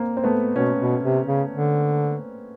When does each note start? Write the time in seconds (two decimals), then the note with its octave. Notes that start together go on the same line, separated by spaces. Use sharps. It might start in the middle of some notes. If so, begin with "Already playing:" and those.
Already playing: A#3 C4
0.17 C4
0.24 A3 B3
0.55 B2 B3 C#4
0.79 B2
1.03 C3
1.26 C#3
1.51 D3